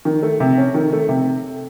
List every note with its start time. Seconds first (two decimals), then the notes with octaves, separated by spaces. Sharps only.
0.05 D#3
0.22 A3
0.40 C3
0.58 C#4
0.74 D#3
0.93 A3
1.09 C3